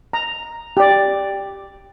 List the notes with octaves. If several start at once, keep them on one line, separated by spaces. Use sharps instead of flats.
A#5
G4 D5